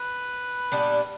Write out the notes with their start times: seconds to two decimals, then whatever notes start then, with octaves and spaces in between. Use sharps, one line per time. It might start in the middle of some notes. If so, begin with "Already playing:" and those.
Already playing: B4
0.72 A#2 G3 B3 D4